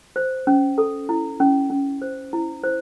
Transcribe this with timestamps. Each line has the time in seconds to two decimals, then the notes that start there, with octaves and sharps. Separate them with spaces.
0.16 C5
0.47 C#4
0.78 A4
1.09 E4
1.40 C#4
1.70 C#4
2.02 C5
2.33 E4
2.64 C5